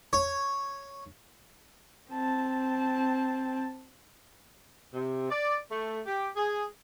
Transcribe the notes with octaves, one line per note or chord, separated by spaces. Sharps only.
C#5
C4 A5
C3
D5
A3
G4
G#4